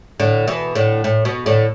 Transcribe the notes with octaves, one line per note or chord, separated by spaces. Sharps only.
A2 D3
B2 E3
A2 D3
A2
B2
A2 D3